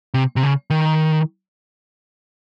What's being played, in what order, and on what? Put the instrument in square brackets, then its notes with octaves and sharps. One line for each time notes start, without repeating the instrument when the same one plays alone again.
[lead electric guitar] C3
C3
C#3
D#3